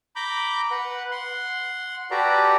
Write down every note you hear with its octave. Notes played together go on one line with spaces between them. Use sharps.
A#5 B5 D6 G6
B4 F#5
F#5 C6
F#4 G4 A4 B4 D5 A#5